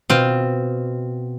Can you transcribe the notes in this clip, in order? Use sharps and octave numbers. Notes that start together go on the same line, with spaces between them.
B2 C4 F4